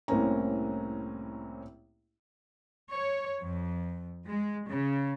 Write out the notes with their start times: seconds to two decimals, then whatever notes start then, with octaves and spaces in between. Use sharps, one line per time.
0.08 C2 A2 A#3 C4 C#4 A#5
2.92 C#5
3.43 F2
4.25 G#3
4.69 C#3